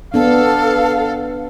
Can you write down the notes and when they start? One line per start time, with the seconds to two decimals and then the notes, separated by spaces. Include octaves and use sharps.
0.14 B3 D4 A4 F5